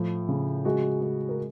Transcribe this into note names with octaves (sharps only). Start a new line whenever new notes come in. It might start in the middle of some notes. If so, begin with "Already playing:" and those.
Already playing: A2 F3
C#3
G#3 F#4
G#3
A#4